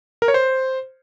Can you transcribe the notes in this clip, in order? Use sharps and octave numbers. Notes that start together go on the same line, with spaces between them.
A#4
C#5
C5